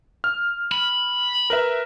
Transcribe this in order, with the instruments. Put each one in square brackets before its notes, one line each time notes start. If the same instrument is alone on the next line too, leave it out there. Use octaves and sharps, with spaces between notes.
[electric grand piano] F6
[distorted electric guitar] B5
[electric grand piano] A#4 B4 E5